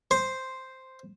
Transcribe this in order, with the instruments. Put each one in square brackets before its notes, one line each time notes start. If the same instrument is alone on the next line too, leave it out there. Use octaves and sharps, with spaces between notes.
[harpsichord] C5